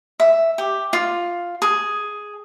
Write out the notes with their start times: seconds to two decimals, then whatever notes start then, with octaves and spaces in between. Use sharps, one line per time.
0.20 E5
0.58 G4
0.93 F4
1.62 G#4